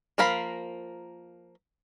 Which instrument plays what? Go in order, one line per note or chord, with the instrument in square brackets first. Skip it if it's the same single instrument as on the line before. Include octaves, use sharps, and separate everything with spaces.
[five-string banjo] F3 A#3 A#4 F5 B5